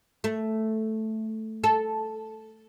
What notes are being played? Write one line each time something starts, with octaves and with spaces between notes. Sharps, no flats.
A3
A4